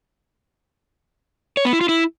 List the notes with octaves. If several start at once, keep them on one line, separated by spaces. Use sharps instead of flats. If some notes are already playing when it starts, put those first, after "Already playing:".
C#5
B3
E4
F4
E4